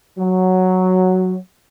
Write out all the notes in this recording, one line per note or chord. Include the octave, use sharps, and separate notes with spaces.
F#3